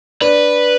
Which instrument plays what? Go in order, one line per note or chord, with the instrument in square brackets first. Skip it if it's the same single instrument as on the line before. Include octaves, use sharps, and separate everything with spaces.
[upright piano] D4 [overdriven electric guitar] B4